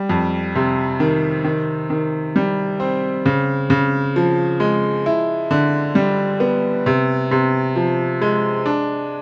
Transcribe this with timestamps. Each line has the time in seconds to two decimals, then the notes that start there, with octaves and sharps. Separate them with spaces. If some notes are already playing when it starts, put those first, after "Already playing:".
Already playing: G3
0.10 F2
0.56 C3
1.00 D#3
1.44 D#3
1.90 D#3
2.36 G3
2.80 C4
3.26 C#3
3.70 C#3
4.16 F3
4.60 G#3
5.06 E4
5.51 D3
5.95 G3
6.40 B3
6.86 C3
7.31 C3
7.76 F3
8.21 G#3
8.66 D4